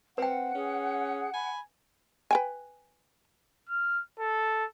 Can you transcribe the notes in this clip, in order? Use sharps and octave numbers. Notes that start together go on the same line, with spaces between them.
C4 B4 F#5 G5
C#4 G#4
G#5 B5
B4 G5 G#5
F6
A4